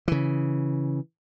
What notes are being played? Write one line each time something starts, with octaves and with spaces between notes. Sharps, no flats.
C#3 E3